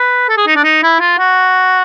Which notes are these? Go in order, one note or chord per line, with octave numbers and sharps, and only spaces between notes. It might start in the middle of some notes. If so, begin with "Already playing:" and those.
Already playing: B4
A4
G#4
D#4
D4
D#4
E4
F4
F#4